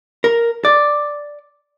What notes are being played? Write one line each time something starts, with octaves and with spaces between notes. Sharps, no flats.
A#4
D5